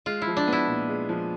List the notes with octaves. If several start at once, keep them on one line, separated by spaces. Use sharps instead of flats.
G#3 F4
E4
F3
D4
B3
E4
A#2
G#3
F3